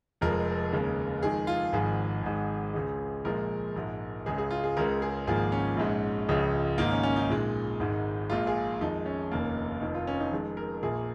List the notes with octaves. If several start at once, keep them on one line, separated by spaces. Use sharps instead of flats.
F1 F2 F3 G#3 A#4
D#2 C#3 G#3
F2 D#3 G#3 G#4
F4
G#1 G#2 F3 G#4
G#1 G#2 G#3
C#2 C#3 G#3
A#1 A#2 F3 G#3 A#4
A#1 G#2 G#3
C#2 C#3 G#3 G#4
G#4
F4
G#4
C#2 C#3 G#3 A#4
G#4
G#1 G#2 F3 A#3 G#4
C#4
A#1 G#2 G#3
C#2 C#3 F3 G#3
G#1 G#2 D#3 A#3 D#4
C#4
C#4
D#4
A#1 A#2 G#3
G#1 G#2 D#3 G#3
A#1 A#2 F3 G#3 F4
G#4
F2 D#3 G#3 D#4
C#4
F1 D#2 D#3 A#3
F1 F2 D#3 D#4
F4
C#4
D#4
F2 D#3 G#3
A#4
A#1 A#2 A#3 G#4